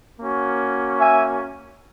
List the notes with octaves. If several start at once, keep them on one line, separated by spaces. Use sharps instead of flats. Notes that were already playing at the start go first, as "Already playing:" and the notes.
A#3 C#4 F#4
E5 G#5